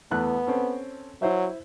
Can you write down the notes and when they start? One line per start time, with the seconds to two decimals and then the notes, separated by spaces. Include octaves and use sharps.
0.11 E2 A3 B3 F#6
0.47 C4 C#4 A4
1.22 F#3 E4 C5 E5